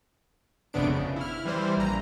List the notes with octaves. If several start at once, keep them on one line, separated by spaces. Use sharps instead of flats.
G#1 F2 C3 B3 D4 D7
C#3
E4 F6
E3 G3 C5
A#1 A#5